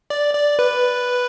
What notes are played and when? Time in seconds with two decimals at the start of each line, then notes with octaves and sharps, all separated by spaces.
0.10 D5
0.35 D5
0.59 B4